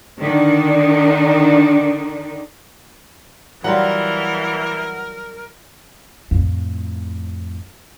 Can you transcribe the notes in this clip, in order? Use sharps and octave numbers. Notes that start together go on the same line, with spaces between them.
D3 D#3 D4 D#4
E3 F#3 G3 F4 A#4 F#5
F2 A2